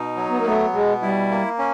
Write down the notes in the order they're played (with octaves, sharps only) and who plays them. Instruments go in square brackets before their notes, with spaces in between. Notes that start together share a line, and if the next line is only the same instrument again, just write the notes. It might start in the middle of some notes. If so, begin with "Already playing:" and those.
Already playing: [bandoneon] B2 D#4
F#3
[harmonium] B3
A#3
[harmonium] A3 [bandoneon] B3
[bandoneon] B2 [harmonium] G#3
[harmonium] G3 [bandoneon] E4
[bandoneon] A#3
C#4